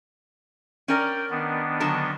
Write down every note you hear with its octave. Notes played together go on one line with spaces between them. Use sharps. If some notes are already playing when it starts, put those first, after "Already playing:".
C#4 A#4 D5 G5
D#3 B3 D4
D3 F#3 A5